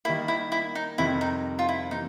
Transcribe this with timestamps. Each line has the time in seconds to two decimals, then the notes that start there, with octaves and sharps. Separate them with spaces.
0.05 D#3 G3 A#3 E4
0.28 E4
0.52 E4
0.75 D#4
0.98 F2 C3 D#3 G3 E4
1.21 D#4
1.59 F4
1.69 E4
1.91 C3 E3 G3 A#3 D#4